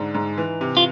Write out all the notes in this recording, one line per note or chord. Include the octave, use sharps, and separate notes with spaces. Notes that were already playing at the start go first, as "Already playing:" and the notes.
Already playing: G#2 D3 D#4
G#2
E3
C3
F4